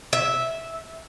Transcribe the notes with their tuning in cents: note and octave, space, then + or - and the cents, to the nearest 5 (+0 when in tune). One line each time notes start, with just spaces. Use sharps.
E5 -10